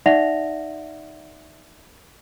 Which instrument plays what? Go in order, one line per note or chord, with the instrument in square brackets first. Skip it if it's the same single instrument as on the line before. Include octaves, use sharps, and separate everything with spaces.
[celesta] D#4 D5 E5 F#5 A#6 F7